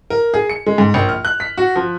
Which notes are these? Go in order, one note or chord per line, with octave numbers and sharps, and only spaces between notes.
A#4
G#4
C#7
G#3
G#2
A#1
F6
F#6
B6
F#4
F3